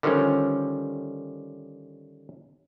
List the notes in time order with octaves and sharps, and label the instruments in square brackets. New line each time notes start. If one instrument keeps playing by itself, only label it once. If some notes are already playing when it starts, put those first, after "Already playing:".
[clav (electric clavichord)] D3 D#3 F3 G3 C#4